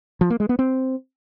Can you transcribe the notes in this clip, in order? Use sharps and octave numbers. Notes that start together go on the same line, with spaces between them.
F3
A#3
G#3
B3
C4